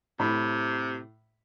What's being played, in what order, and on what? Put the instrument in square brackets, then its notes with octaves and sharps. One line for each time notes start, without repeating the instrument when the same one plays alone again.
[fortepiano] A2 B5 [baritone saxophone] C3